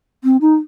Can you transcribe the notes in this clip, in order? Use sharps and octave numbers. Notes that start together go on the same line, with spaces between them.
C4
D#4